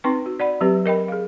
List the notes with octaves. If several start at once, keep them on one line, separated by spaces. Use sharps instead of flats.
C4 D#4 B4 G5 C6 C#6
F#4
D5 F#5 B5
F#3 C4 G4 B4
A#4 D#5 G5 B5
G#4 F5